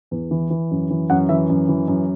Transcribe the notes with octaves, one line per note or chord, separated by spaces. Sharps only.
E2
E3
E3
F#2
E3
F#2 F#5
E3 E5
F#2
E3
F#2